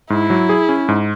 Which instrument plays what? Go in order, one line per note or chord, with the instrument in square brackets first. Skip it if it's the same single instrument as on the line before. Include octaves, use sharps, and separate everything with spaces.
[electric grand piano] G#2 [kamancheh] E4
[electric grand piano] F#3
G#4
C#4
G#2